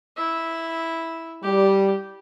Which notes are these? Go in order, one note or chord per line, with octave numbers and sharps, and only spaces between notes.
E4 E5
G3 G4